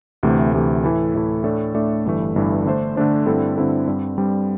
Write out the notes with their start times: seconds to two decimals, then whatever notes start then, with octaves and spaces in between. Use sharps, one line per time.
0.23 D2 C3 E3 A3
0.53 D2 C3 E3 A3
0.84 A2 E3 A3 E4 A4
1.14 A2 E3 A3 E4 A4
1.44 A2 A3 D4 A4 D5
1.74 A2 A3 D4 A4 D5
2.05 G1 G2 E3 A3
2.36 G1 G2 E3 A3
2.66 D3 A3 D4 C5
2.96 D3 A3 D4 C5
3.26 G2 D3 C4 E4 A4
3.57 G2 D3 C4 E4 A4
3.87 G2 G3 C4
4.17 G2 G3 C4